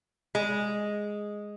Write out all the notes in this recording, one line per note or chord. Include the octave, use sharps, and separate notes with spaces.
G#3